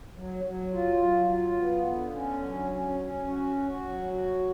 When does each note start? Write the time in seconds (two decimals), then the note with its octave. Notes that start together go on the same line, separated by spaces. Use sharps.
0.16 F#3
0.44 F#3
0.73 F4
1.01 F#3
1.29 F4
1.58 B3
1.86 D3
2.15 C#4
2.43 F#3
2.71 C#4
3.00 C#4
3.28 F#4
3.57 F#4
3.85 F#3
4.13 F#4